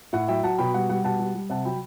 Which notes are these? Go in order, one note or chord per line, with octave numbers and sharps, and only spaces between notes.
A2 F#5
F#3 E5 G5
F#3 F#5 A5
B2 G5 B5
G3 F#5
G3 F#5
B2 F#5 A5
G3
G3
C3 F#5 A5
F#3 G5 B5